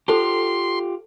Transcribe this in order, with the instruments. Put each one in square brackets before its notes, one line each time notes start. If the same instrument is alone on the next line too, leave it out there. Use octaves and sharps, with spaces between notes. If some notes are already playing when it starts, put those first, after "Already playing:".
[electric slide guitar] F4 G4 [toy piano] A4 C5 A5 [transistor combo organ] C6